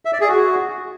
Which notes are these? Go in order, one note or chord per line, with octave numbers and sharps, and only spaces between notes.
E5
D5
G#4
F#4